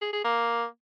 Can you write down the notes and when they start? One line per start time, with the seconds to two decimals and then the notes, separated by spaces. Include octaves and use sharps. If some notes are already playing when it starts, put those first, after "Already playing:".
0.02 G#4
0.13 G#4
0.25 A#3